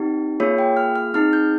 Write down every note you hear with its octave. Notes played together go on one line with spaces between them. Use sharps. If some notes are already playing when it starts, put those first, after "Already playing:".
Already playing: C4 D#4 G4
A#3 F4 G#4 C#5
G5
F6
F6
C4 D#4 G#4 F6
G6